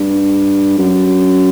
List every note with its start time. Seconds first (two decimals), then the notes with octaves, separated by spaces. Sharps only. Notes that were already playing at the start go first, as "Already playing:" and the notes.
Already playing: G2
0.78 F#2